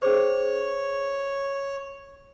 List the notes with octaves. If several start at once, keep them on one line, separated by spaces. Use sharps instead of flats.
C#4 G#4 C5 C#5